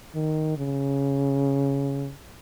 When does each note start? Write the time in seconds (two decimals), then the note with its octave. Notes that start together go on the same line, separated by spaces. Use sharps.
0.15 D#3
0.57 C#3